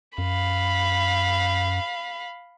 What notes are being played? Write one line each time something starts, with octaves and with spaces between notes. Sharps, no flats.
F#2 F5 B5